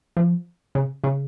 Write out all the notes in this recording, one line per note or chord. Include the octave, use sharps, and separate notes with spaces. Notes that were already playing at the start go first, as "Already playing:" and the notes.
F3
C#3
C#3